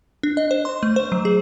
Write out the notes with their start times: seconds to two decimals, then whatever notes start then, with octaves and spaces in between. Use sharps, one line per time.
0.23 D4
0.37 D#5
0.51 C5
0.65 C6
0.83 A3
0.96 C5
1.12 F#3
1.25 G#4